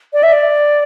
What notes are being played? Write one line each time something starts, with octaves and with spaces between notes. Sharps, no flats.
D5
E5
D5